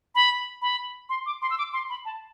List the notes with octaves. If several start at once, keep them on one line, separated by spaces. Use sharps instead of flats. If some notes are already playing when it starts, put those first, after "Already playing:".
B5
B5
C6
D6
C6
E6
D6
C6
B5
A5